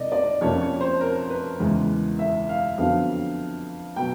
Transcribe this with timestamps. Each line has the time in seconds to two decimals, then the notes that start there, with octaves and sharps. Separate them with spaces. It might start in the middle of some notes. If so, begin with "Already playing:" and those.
Already playing: C3 D#3 D5 D#5
0.12 D5
0.41 F2 C3 F3 A#3 C#4 C#5
0.62 C#5
0.81 C5
1.01 A#4
1.30 B4
1.60 E2 C#3 E3 G#3
2.19 E5
2.49 F5
2.78 F2 D3 F#3 B3 F5
3.96 B2 F#3 G5